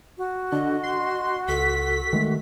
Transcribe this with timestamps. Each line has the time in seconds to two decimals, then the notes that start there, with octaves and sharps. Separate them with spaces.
0.18 F#4
0.52 D3 D#5
0.83 C6
1.48 C#2 A4 B6
2.13 D#3 G#3 A3